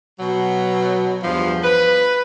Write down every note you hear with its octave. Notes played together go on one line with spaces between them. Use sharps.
B2 F#3
E2 G2 F3
B4